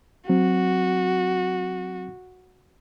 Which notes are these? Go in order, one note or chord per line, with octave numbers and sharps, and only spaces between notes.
F#3 C4 F#4